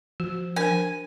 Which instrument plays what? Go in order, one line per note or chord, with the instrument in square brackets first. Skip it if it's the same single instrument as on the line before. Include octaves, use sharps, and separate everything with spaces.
[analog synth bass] F3 [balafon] F#4
[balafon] D4 A#4 C5 [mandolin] G#5